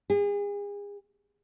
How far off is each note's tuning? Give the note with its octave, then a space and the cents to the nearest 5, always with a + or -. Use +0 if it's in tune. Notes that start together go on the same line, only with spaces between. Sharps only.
G#4 -35